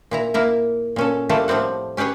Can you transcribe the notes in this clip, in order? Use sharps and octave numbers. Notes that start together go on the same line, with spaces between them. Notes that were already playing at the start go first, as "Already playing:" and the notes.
A#2 E4 A#5
A#3 E4 A#4
A#2 C#4 A4
G3 A3 A#3 E4 F4 A4
A2 F3 G3 C4 F#5
C#4 G4 G#4 B4 C#5